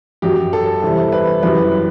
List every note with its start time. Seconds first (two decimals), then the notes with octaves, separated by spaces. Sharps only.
0.22 F#2 F#3 G4
0.53 A4
0.82 E2 C3 G3
1.12 B4
1.43 F#2 E3 G3 B4